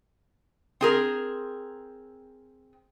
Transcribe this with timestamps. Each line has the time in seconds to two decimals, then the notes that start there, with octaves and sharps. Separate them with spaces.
0.81 C4 G#4 A#4